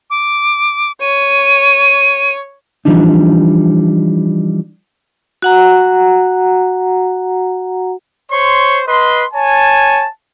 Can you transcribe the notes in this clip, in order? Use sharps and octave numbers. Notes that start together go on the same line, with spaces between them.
D6
C#5 D#7
E3 F3 G3 D4 D#4
F#4 F#5 A#5
C5 C#5 C6 C#6
B4 D#5 C6
C#5 G#5 A5